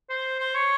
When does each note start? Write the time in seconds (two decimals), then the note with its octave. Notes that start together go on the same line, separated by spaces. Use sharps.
0.10 C5
0.39 C5
0.54 C#5